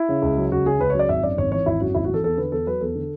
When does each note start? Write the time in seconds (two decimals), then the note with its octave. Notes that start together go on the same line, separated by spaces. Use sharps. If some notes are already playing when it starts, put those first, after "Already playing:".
Already playing: E4
0.09 C#3
0.22 C#2
0.38 F#3
0.52 C#2 F#4
0.66 C#3 G#4
0.79 C#2 B4
0.90 C#5
0.94 F#3 D5
1.09 G#1 E5
1.23 F#2 D5
1.37 G#1 C#5
1.51 E3 C#5
1.66 G#1 E4
1.80 F#2 F#4
1.95 G#1 E4
2.04 F#4
2.09 E3 A4
2.23 E2 A4
2.38 D3 B4
2.52 E2 A4
2.67 F#3 B4
2.81 E2 A4
2.96 D3